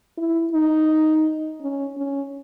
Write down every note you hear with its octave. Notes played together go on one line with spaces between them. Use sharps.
E4
D#4
C#4
C#4